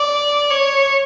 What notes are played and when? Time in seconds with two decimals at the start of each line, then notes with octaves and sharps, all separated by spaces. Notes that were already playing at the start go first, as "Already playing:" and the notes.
Already playing: D5
0.51 C#5